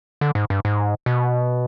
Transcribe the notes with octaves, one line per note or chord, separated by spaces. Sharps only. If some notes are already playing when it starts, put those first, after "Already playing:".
D3
G#2
G2
G#2
B2